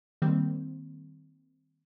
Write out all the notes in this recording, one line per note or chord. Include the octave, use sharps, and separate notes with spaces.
D#3 G3 A#3 C4